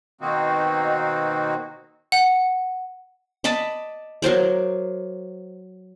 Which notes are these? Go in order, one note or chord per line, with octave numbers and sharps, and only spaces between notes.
B2 D#3 A#3 C4 D#4 F#4
F#5
D5 D#5 A5 B5
F#3 A#4 C5 D5